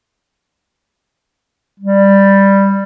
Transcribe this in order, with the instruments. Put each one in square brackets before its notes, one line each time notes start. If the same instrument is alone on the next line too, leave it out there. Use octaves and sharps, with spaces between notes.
[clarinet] G3